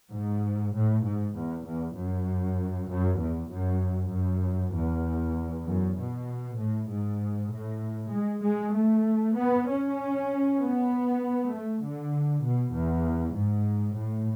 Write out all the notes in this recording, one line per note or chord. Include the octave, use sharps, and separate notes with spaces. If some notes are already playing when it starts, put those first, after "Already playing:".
G#2
A2
G#2
E2
E2
F#2
F#2
E2
F#2
F#2
E2
F#2
B2
A2
G#2
A2
G#3
G#3
A3
B3
C#4
B3
A3
D3
B2
E2
G#2
A2